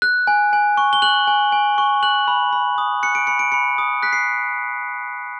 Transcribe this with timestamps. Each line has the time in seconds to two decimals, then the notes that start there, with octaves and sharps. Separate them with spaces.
0.02 F#6
0.27 G#5
0.53 G#5
0.77 C#6
0.93 G7
1.02 F#6 F#7
1.27 G#5
1.52 G#5
1.78 C#6
2.03 F#6 F#7
2.28 B5
2.53 B5
2.78 D#6
3.03 F#6 C#7
3.15 D7
3.27 B5 C#7
3.39 D7
3.52 B5 C#7
3.78 D#6
4.03 F#6 B6
4.13 C7